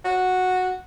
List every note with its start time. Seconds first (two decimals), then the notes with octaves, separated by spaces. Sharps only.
0.05 F#4